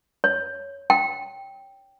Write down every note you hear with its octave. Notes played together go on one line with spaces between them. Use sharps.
C#5
G5